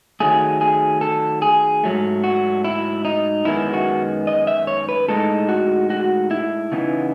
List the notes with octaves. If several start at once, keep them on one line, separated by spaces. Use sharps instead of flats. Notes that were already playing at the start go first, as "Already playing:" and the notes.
D#3 F#3 A3 G#4
G#4
A4
G#4
G#2 F#3 A3
F#4
E4
D#4
F#2 D#3 G#3 B3 E4
F#4
D#5
E5
C#5
B4
A2 G#3 D#4 A4
F#4
F#4
E4
C#3 E3 B3 D#4